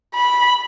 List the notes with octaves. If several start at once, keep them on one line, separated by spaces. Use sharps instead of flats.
B5